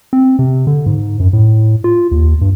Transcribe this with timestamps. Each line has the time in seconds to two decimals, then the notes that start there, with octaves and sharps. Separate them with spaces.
0.13 C4
0.39 C3
0.67 D3
0.86 G#2
1.20 F#2
1.33 A2
1.84 F4
2.11 D#2
2.41 G2